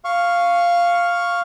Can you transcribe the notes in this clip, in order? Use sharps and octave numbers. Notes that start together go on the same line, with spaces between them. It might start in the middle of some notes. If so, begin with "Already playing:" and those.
F5 C#6